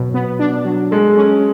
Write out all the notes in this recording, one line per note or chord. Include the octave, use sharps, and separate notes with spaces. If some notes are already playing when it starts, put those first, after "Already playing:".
Already playing: B2 F#3
B3
D4
F#3
G#3 A4
C#4